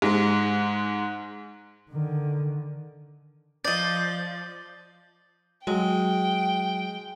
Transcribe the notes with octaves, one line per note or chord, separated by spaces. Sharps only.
G#2 G#3
D3 D#3
F3 D5 D#5 G6 A6
F#3 G#3 G5